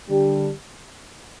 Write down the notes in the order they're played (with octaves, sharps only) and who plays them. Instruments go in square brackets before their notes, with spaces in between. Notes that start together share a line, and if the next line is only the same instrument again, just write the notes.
[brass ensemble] D3 G3 D4 G4